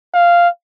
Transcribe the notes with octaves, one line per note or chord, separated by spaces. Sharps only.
F5